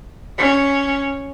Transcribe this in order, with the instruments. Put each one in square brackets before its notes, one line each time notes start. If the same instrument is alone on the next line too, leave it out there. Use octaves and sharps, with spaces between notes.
[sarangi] C#4